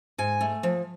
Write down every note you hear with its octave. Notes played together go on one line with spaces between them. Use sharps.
G#2 G#5
A3
F3